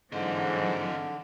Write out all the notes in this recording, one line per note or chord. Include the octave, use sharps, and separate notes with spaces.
G#2 D3 E3 F#3 C4 D#5